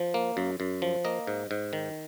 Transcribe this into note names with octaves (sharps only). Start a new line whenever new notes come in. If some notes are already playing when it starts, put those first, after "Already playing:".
Already playing: F3
A#3
F#2
F#2
F3
A#3 D#5
G#2
G#2
D#3